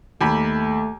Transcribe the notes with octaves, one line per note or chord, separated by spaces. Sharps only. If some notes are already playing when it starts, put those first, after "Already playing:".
D#2 A3 B5